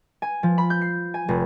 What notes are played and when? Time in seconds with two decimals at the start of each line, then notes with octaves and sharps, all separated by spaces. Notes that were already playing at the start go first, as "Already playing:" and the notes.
0.22 G#5
0.43 F3
0.58 B5
0.70 G6
0.82 C7
1.14 G#5
1.28 F1